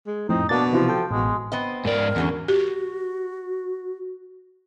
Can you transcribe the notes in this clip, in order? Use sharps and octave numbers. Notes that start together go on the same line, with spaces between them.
G#3
F2 A2 C4 D#4
B2 A#3 D4 A6
C3 E3 F3 F#4
A4 G5
A1 B2 G#3
B3 C4 D#5
G#2 A#4 D5
E2 D3 F#3 C#4
F#4 G4